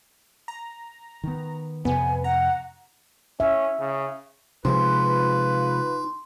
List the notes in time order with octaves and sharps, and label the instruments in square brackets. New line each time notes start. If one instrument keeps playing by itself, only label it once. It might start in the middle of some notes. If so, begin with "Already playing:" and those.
[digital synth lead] A#5
[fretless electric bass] D#3 B3
[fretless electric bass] F2 C3 [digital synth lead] B3 [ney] G#5
[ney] F#5 [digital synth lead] A#5
[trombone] C#4 [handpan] E5
[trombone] C#3
[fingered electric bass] C3 F3 G#3 [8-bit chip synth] D#4 [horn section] F4 B4 [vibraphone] C6